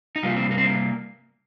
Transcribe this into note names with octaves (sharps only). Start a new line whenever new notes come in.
D#4
C3 G3 A#3 F4
C4
A#3
C4
A#3